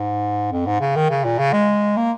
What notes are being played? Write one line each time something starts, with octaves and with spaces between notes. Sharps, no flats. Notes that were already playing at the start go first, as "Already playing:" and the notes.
Already playing: G#2
F2
G#2
C#3
D#3
C#3
A#2
C#3
G#3
A#3